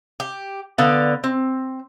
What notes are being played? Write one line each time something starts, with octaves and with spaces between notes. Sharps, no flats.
G4
D3 B3 D5 F5
C4